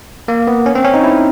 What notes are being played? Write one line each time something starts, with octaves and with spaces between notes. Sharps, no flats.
A#3
B3
C#4
C4
C#4
D#4
E4